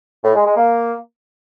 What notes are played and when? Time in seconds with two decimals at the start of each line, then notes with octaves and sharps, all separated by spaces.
0.24 A2
0.35 G#3
0.46 G#3
0.57 A#3